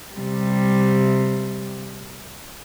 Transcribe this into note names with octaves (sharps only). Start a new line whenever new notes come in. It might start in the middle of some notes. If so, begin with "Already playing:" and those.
C3 G3